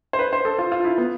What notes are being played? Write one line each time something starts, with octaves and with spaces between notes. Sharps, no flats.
C5
B4
C5
A4
F4
F4
E4
B3